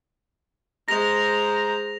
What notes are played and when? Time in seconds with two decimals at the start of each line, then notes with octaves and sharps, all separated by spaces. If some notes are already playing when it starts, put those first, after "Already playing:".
0.88 G#3 C5 A#5 A#6 F7